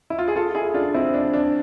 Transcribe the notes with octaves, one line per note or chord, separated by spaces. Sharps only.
E4
F4
G#4
F4 A4
E4 G#4
D4 F4
C4 E4
D4
D4